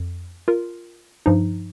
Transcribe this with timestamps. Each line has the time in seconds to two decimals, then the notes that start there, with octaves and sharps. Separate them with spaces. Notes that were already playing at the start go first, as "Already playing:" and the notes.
Already playing: F2
0.48 F4 A#4
1.26 G2 F3 D#4